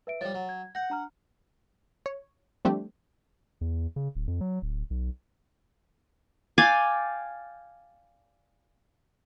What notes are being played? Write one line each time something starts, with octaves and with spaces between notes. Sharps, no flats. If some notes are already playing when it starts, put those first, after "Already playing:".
B4 E5 D7
F3 G3 C#5 A6
F#3
G#6
F#5 G6 A#6
D4 A#5 F6
C#5
F3 G3 A3 C4 D4 G4
E2
C#3
D1
F2
F#3
D1
B1
D5 F5 G5 G#5